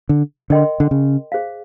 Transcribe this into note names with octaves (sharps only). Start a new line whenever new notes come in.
D3
D3 A#4 D#5 G5 C6
D3
C#3
G#4 C5 F5